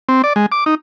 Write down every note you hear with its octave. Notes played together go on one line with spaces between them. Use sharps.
C4
D5
G#3
D6
D#4